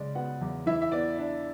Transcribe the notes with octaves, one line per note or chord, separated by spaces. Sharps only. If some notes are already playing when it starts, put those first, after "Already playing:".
Already playing: C#3 G#3 D5
B3 F#4 F#5
E2
E3 E4 E5
E5
B3 D5
D4